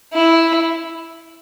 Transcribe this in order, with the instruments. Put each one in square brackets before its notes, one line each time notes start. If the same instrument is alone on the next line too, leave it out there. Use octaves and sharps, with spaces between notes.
[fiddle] E4